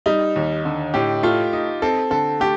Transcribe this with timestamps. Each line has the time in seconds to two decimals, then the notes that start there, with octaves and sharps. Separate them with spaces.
0.06 G3 D#4
0.36 D#2
0.65 D3
0.94 A2 G4
1.23 A3 F4
1.53 D#4
1.82 C4 A4
2.11 D3 A4
2.40 A3 G4